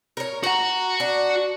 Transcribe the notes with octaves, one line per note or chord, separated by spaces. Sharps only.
A#4 C#5
F#4 F#5 A#5
D4